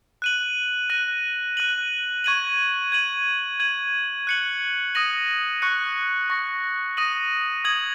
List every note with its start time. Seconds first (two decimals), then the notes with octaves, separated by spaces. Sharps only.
0.22 F#6 D#7 F#7
0.90 F#6 A#6 D#7 F#7
1.57 F#6 D#7 F#7
2.24 C#6 G#6 D#7 F#7
2.92 G#6 D#7 F#7
3.60 G#6 D#7 F#7
4.27 F#6 C#7 F#7
4.95 D#6 A#6 D#7 F#7
5.62 C#6 F#6 C#7
6.30 C#6 A#6 C#7
6.97 D#6 A#6 D#7 F#7
7.64 D#6 G#6 F#7